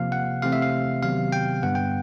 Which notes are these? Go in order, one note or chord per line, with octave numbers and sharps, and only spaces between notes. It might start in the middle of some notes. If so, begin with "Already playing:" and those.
Already playing: C3 F3 A#3 F5
F#5
C3 E3 A3 C4 F5
E5
F5
C3 D#3 F#3 B3 F5
G5
G2 D3 G3 B3 F#5
G5